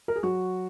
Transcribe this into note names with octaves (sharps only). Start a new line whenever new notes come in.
A#4
G#4
F#3 F#4